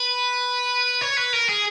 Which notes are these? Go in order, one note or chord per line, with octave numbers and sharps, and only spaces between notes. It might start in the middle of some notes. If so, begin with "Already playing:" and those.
Already playing: B4
C#5
B4
A#4
G#4